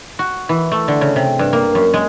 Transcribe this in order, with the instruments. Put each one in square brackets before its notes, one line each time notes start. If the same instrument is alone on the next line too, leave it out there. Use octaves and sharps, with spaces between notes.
[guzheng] F#4
E3
A3
D3
C#3
C3
G2
A#3
F#2
G#3